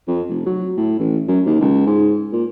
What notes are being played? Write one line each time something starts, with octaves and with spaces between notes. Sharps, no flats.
F2
F1
F#3
A2
A1
F#2
D#2
C#2
G#2
A#2